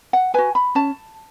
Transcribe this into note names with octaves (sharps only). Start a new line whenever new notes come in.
F#5
F#4 B4 G#5
B5
C#4 A5